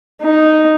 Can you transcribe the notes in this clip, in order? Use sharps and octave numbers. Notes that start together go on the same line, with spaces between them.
D#4